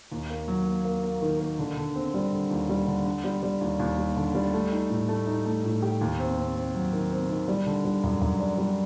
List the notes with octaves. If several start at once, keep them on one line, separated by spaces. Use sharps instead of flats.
D#2
A#3
F#3
A#3
A#3
A#3
D#3
A#3
D3
D3
C4
G3
D3
D#2
G3
D3
D3
G3
G3
D#2
D#2
G3
D3
G3
A3
D#4
A2
A3
D#4
A3
A2
G4
D#2
C4
C4
C4
F#3
D#3
C4
D#3
G3
D3
G3
F#2
F#2
D4
G3